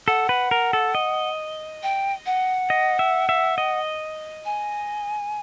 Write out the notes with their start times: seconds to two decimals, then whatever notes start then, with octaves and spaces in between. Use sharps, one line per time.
0.07 A4 F#5
0.29 B4
0.51 A#4
0.73 A4
0.95 D#5
1.83 G5
2.26 F#5
2.70 D#5
2.99 E5
3.29 E5
3.58 D#5
4.45 G#5